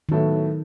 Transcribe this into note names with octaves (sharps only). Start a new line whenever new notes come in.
A2 D#3 F#3 B3 E4 A4